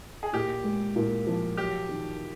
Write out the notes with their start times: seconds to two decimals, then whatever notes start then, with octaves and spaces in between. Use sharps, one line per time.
0.23 G#4
0.33 A#2 G4
0.64 G#3
0.96 A#2
1.27 F3
1.57 F#3 G4
1.89 D#3